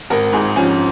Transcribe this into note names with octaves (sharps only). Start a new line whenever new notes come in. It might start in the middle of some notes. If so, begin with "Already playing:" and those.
G#1 A#4
G#2 G#4
F3 C#4